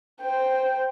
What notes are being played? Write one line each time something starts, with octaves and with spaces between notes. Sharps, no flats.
C5 G5